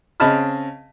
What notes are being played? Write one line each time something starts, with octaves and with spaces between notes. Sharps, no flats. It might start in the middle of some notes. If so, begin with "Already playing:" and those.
C#3 C4 D#5 A5 B5 F6